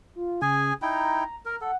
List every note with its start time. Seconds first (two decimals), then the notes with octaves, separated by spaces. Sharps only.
0.15 F4
0.42 C#3 G#4 G#5
0.82 D#4 E4 G5 A#5
1.45 A#4 A#5
1.61 A4 F#5